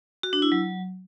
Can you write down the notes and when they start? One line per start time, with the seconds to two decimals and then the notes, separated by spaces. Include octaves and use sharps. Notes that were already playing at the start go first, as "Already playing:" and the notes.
0.23 F#4
0.33 D4
0.42 E4
0.52 F#3